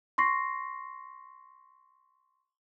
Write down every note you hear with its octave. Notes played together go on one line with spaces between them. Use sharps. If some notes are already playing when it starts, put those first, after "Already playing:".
C6 C#6 A#6 C7